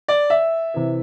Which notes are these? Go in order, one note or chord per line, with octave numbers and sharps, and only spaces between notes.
D5
E5
C3 E3